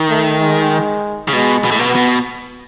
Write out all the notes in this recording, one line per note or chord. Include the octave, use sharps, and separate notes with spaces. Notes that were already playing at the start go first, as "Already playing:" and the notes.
Already playing: D#3
A3
G#3
C#3
B2 G#3
B2
A2
B2 B3
B2